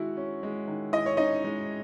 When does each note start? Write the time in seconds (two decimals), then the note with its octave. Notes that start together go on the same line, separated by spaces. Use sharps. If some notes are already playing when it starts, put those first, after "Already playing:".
Already playing: D#3 G#3 E4 F#4
0.17 C#4
0.43 G#3
0.67 D#3
0.93 E4 D#5
1.06 C#5
1.17 C#4 D#4 D#5
1.44 G#3